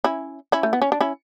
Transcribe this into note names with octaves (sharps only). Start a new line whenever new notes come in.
C#4 E4
C#4 E4
A3
B3
C#4
D4
C#4 E4